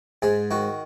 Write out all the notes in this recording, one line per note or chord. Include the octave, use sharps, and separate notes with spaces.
G#2 G#4
D#3 F#4